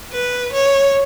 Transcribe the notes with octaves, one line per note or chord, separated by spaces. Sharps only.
B4
C#5